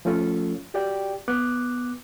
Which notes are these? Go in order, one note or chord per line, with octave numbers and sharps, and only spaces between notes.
F3 A3 C#4 F4 A4
F#4 G4 D5 G5
B3 D6 F#6